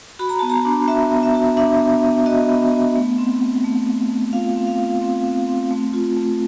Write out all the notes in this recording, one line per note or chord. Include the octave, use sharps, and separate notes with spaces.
F#4 B5
A#5
B3 A5
A#5
D4
F#4 E5
B3
E5
F#4
D4 E5
B3
B3
F#4 D#5
B3
B3
A3
C4
C4
A3
A3
A3
F4 F5
C4
F5
F4
C4
C4
C4
A3
F4
A3